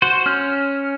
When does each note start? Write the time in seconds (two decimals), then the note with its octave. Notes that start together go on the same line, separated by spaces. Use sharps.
0.02 F#4 C5
0.26 C#4 F6 G6